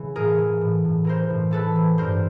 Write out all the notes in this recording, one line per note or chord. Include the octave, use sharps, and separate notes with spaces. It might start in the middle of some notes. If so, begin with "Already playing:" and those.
Already playing: C#3 E3
A2 G#4 A#4
E3
A2
A2
E3 A#4 C5
A2
E3 A4 B4
E3
G2 A#4 C5